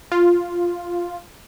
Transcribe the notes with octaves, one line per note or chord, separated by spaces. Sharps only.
F4